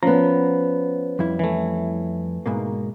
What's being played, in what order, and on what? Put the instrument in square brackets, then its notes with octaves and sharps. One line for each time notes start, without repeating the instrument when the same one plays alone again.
[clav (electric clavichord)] F3 [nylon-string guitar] B3 C#4 [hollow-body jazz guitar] A#5
[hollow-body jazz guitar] F2 G3 E4
[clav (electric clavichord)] E3 A3
[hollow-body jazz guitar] G#2 B2 A#3